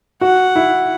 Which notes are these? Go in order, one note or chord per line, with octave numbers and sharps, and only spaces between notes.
F#4 F#5
E4